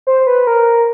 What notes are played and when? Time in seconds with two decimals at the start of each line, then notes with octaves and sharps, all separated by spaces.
0.07 C5
0.27 B4
0.47 A#4